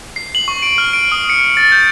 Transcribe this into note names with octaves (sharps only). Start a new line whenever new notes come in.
C7
F#7
C#6
D7
F6
D7
D#6
C#7
A6
G6